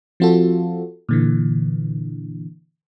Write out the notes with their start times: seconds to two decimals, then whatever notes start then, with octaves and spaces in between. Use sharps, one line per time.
0.20 F3 C4 F4 F#4 A4
1.09 A#2 D3 E3